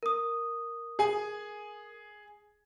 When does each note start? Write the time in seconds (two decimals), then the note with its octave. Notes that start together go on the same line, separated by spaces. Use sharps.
0.03 A#4 D#6
0.99 G#4 G#5